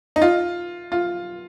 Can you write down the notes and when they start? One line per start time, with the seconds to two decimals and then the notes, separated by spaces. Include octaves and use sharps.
0.16 D#4
0.22 F4
0.92 F4